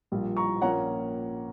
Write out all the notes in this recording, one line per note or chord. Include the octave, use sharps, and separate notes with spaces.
A#1 A#2 G3
A#5 C#6
A#1 A#2 A#3 C#4 F#5 A#5